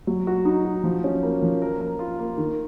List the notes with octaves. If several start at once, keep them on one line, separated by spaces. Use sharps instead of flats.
F#3
F#4
D#4
F#4
F3
C#4
A#3
F3
A#4
A#4
F4
A#3
D#3